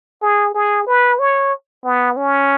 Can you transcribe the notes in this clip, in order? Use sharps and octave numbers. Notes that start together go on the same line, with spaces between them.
G#4
G#4
B4
C#5
B3
C#4